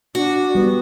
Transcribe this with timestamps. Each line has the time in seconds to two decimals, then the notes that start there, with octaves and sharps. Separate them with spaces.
0.15 D4 F#4
0.55 G3 B3